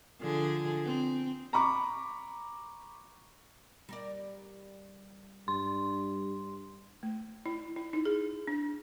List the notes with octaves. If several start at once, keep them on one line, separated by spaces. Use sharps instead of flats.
D3 F3 G#4
C4
A#5 B5 C#6 D6
G3 A#4 D5
G2 C6
A3
E4
E4
D#4
G#4
D4